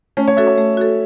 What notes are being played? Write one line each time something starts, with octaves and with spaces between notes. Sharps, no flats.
A3 C#4
C#5
F#4 A4 E5
C#5
A3
F#4 A4